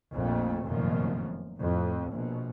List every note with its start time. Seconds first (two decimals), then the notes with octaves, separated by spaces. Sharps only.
0.13 A#1 F2 A#2 A3
0.65 F1 F#2 A#2 D#3 F3
1.60 F2 A2
2.12 A#1 B2